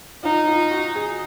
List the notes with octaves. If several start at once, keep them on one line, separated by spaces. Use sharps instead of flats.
D#4 F4
F4
F#4
G#4